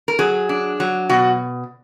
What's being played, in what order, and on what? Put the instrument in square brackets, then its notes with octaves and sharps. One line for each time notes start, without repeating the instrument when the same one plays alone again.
[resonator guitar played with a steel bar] A#4
F#3 G#4
D4
F#3
B2 F#4